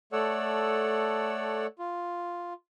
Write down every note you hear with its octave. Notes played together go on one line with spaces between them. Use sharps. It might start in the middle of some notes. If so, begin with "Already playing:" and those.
A3 A4 C#5 D5 F#5 E6
F4